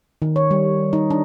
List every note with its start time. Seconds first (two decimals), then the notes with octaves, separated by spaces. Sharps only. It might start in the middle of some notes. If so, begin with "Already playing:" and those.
0.22 D#3
0.36 C#5
0.51 G3
0.93 D#4
1.11 D4